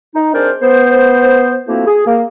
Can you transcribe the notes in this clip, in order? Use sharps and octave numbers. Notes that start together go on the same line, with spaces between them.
D#4
G#3 C4 D4 A#4 C5 D5
B3 C5
F3 A3 A#3 C4 E4 F#4
G#4
A#3